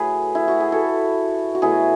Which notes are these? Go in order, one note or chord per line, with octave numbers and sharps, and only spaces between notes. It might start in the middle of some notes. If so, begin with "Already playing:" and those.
Already playing: A2 F#3 A3 G#4 B4
E4
F#4
G#4
F#4 A4
F#4
B2 F#3 A3 E4 G#4